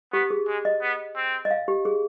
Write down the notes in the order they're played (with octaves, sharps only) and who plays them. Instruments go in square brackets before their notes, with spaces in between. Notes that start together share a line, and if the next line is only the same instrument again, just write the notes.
[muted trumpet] B3 [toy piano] G4
[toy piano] G#4
[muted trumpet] G#3
[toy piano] D#5
[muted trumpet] B3
C4
[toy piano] D#5
F5
G4
G#4